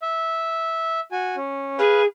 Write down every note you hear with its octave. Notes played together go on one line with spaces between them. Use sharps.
E5
F#4 G#5
C#4
G#4 B4 F5